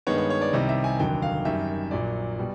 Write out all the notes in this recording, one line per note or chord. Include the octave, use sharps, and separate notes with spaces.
G2 D#3 G#3 B3 C#5
C#5
C#5
D5
C2 C3 D#3 G3 D#5
E5
G#5
F1 D#2 D3 F#3 G5
F5
F#2 D#3 G3 E5
A#1 A#2 F#3 D5
B2 G3